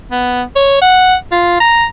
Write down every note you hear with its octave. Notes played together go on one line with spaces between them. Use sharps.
B3
C#5
F#5
F4
A#5